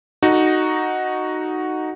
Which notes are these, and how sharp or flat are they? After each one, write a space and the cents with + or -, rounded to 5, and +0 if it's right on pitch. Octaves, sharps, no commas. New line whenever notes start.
D#4 -5 F#4 +0 A4 +0